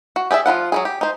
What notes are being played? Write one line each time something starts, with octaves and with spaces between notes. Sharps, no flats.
F#4
G4 G#4 D5 E5
F3 E4 F4 F#5
F#3 G#3 G#4
G4
D#4 C5